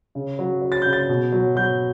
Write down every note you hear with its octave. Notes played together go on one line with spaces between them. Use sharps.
C#3
F#3
F#3
A6
C#3 G6
A6
B2
F#3
F#3 G6